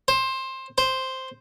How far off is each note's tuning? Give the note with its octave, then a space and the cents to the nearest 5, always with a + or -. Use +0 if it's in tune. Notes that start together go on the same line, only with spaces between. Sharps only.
C5 +15
C5 +0